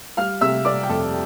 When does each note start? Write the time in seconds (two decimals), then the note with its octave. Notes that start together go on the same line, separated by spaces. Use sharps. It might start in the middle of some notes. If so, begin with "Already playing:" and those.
0.17 G3 F5 F6
0.41 C3 E5 E6
0.65 G3 D5 D6
0.83 G5
0.89 F2 A4 A5